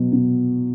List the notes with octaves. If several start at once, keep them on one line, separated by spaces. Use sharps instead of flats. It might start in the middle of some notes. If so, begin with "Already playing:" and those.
Already playing: B2 F#3
B2